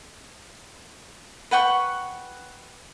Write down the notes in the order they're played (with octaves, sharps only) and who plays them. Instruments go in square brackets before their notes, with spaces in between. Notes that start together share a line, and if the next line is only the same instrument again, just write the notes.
[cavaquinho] B4 F#5 G5 C#6